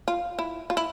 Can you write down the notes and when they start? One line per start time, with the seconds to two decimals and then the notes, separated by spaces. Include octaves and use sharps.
0.08 F4
0.39 E4
0.70 F4
0.77 E4